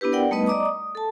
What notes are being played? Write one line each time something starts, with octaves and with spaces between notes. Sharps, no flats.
B3 D4 E4 G4 B4
A#4 D5 F#5 G5
G3 A3 B3 D#4 B4 D#5
D5 D#5 A#5 D6 D#6
D#6
A4 A5